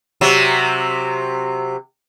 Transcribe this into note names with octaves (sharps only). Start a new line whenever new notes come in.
C3 F#3